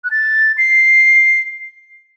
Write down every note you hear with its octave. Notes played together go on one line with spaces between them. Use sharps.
F#6
A6
C7